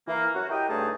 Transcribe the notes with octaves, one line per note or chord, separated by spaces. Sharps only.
E3 A#3
F#2 F#4
E4 G4 A#4 D#5 G5
G2 C#3 A3 D#4 G#4 A5